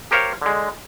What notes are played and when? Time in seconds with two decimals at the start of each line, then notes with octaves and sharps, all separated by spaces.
0.11 G4 A#4 C5 C#5 F5
0.42 D3 G#3